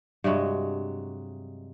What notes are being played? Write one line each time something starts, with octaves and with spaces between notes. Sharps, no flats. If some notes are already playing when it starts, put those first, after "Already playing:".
G2 C3 F#3 G#3